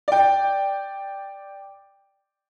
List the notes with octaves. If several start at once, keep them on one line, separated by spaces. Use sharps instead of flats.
D5 G5